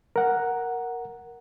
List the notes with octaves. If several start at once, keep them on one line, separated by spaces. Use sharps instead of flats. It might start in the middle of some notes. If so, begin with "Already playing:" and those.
A#4 F#5